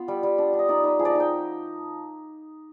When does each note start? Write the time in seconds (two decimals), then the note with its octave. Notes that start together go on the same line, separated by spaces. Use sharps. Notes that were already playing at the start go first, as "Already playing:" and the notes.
Already playing: B3 F4
0.08 G3
0.23 G3
0.38 D4
0.53 D4
0.59 D#5
0.69 D#4 D5
0.84 D#4 B4
0.99 F3 G#4
1.05 D5 D#5
1.15 D#4
1.20 G5